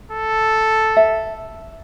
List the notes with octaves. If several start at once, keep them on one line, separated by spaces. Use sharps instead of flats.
A4
E5